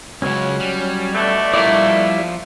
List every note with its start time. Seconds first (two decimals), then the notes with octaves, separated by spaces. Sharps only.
0.22 C#2 C#3 F#3 C#4
0.60 G3
1.14 B2 D3 A3 D5
1.54 F3 G3 E4 G4 A#4 D5